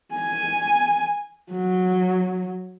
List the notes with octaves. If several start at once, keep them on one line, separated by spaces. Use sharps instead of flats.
G#5
F#3